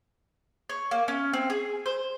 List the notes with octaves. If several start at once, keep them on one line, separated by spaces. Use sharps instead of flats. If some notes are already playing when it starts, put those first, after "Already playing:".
C#5
A#3
C#4
C4
G#4
C5